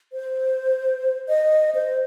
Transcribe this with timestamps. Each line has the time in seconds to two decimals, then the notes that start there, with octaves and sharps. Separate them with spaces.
0.13 C5
1.28 D#5
1.75 C5